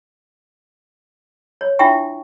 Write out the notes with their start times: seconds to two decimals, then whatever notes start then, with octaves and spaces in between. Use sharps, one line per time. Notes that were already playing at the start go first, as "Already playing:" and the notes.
1.61 C#5
1.79 D4 E4 F4 E5 G5 C#6